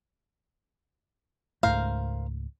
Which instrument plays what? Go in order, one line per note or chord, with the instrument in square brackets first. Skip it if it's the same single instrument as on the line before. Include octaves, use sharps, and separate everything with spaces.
[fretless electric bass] C#2 G#2 A3 [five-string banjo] A#4 C5 F5